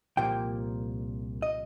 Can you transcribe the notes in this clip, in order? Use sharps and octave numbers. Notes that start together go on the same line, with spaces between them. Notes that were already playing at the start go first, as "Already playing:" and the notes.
C2 A#2 F3 A#3 G5
D#5